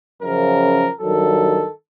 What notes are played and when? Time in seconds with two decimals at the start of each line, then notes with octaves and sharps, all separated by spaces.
0.22 F#2 C#3 F3 A#4
1.01 G2 D#3 F#3 A4